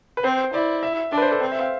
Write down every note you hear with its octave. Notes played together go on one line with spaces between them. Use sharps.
B4
C4 C5
E4 D5
E5
D4 D5
B4
C5
A4
C4 C5
E5
F5